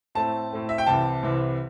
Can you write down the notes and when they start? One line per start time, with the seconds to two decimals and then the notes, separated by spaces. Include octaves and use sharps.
0.15 A2 A3 C4 A5
0.50 A2 A3 C4
0.69 E5
0.78 G5
0.86 C2 C3 E3 A5
1.22 C2 C3 E3